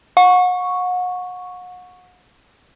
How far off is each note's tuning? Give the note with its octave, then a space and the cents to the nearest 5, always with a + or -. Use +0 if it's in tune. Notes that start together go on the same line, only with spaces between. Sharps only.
F#5 -35 C#6 +0